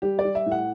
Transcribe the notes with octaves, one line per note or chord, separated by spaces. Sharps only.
G3 G4
D5
G3
E5
A2
F#5